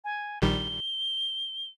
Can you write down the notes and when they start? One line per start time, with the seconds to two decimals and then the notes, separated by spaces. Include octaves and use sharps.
0.05 G#5
0.42 A#1 D#3 G3 G7